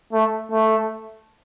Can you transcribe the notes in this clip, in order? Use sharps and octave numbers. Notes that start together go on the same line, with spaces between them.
A3
A3